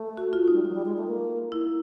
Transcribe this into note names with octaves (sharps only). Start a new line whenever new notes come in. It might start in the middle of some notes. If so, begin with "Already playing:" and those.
Already playing: A3
F#4
F4
G3 D#4
G#3
F#3
G3
G#3
A3
A#3
A#3 E4